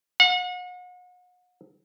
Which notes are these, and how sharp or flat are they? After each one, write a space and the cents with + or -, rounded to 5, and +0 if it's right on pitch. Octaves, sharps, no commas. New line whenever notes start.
F#5 -40